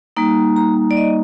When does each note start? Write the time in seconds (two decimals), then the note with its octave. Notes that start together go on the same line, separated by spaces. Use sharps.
0.17 G3 A#3 D#4
0.56 A#5
0.91 D5
0.97 D#5